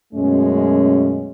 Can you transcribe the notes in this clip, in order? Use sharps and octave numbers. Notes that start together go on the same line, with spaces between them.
F#2 B2 G#3 A3 C#4